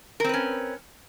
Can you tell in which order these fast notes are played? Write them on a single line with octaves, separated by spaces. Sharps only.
A#4 C4 B4 C#4